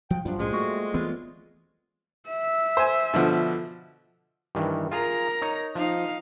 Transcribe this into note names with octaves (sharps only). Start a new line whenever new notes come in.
F3 G5
F#2 F3 G3 D4 F4 F#4
B1 A2 G#3 C#4 C5
A3 A#3 F#4
E3 B3 C4 F4
E5
C5 G#5
B2 D3 F3
G2 D#3 E3
F4 G#4 A#4 A#5
D#4 C#5
F3 D#4 F5